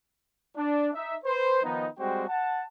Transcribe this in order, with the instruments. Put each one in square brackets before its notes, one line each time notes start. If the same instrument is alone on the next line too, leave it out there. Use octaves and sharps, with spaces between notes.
[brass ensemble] D4
D#4 E5
B4 C5
D#3 F3 B3 D#4
G3 G#3 C4 F#4 C5 G5
F#5 A5